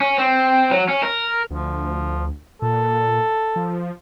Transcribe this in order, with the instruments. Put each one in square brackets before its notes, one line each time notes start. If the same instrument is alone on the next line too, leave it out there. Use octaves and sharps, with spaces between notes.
[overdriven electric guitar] C#4
C4
F#3
C#4
A#4
[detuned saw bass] D2 [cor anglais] F3
[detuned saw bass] A#2 [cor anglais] A4
[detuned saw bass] F3